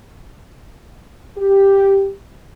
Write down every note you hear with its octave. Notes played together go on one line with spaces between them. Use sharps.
G4